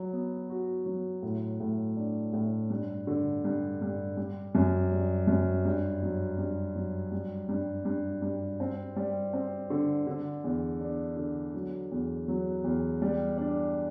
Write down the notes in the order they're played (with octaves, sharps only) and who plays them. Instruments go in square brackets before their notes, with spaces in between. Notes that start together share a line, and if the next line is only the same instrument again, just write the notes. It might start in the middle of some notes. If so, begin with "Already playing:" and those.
Already playing: [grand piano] F#3
B3
F#4
F#3
A2
A2
D4
A2
G2
D3
G2
G2
G3
F#2
G3
F#2
G2
F#3
G2
F#3
G3
G2
G2
G2
C4
G3
C4
D3
D3
E2
D4
D3
F#3
E2
F#3
E2
G3
D4